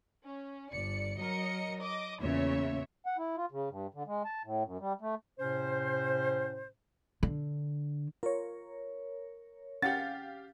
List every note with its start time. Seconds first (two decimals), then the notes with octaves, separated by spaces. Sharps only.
0.24 C#4
0.72 G1 D5 C#7
1.19 F#3 A#4 D#5 C#7
1.79 D#5 D6
2.20 E2 A#2 C#3 C#5 E5
3.06 F#5
3.18 E4
3.36 F4
3.51 C#3
3.69 G2
3.94 D3
4.07 G#3
4.25 A5
4.44 A2
4.64 F#2
4.80 G3
5.01 A3
5.39 A2 C3 C#4 C5
7.23 D3
8.23 F4 A#4 C#5
9.82 C#4 G4 F5 F#5 A6